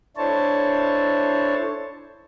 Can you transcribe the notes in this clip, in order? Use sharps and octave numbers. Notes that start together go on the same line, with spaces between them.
D4 E4 A4 C5 C#5 A5